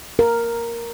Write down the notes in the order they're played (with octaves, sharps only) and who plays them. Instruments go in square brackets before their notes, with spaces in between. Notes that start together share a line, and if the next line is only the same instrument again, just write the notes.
[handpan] A#4